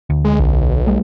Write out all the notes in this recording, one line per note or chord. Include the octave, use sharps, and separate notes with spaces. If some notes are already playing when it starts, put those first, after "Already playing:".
D2
G#3
B1
G3 A3